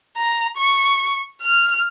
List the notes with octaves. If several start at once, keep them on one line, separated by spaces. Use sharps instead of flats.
A#5
C#6
F6